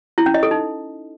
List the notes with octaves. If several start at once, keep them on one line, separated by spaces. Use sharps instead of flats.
E4
C#4
D#5
A4
D#4